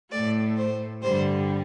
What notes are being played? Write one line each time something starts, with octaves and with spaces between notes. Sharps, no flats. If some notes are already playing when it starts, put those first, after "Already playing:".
A2 A3 D5
C5
G2 D3 G3 C5